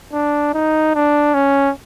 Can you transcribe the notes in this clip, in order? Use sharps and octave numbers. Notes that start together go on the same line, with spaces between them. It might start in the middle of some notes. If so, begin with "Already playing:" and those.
D4
D#4
D4
C#4